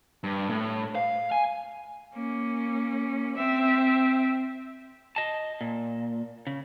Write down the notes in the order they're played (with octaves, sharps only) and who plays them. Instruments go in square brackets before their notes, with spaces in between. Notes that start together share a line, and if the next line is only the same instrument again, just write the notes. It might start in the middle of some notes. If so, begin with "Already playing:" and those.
[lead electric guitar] G2
A2
F5
G#5
[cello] A#3 C#4
C4 E5
[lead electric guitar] D#5 A5
A#2
C#3